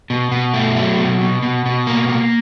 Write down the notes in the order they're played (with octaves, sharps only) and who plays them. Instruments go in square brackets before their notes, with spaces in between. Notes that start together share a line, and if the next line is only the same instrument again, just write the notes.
[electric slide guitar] B2
B2
A3
F#3
B2
B2
B2
B2
A#3
A#3